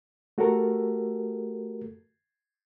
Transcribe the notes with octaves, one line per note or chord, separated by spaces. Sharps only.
A3 F#4 G4 A4 A#4